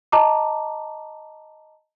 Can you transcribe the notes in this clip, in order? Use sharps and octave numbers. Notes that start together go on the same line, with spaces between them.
D#5 A5 A#5 D6